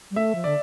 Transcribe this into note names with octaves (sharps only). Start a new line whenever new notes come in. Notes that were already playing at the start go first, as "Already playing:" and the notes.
G3
A3 E5
F3
D3 D5